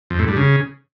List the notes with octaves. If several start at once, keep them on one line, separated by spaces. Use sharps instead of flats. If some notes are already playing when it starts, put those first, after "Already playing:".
F2
A2
G2
C#3